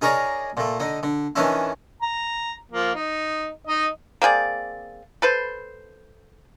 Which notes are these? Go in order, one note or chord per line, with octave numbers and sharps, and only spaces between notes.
D#4 G#4 A#4 C#5 D5
A#2 A3
D3 D#4
D3
D#3 E3 C#4 D4 E4
A#5
F3 A#3
D#4
D#4 D#5
A#3 C4 G#4 D5
A4 B4 C5